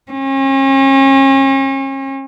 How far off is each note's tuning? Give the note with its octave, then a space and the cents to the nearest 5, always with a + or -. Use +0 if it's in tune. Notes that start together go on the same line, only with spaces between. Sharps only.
C#4 -40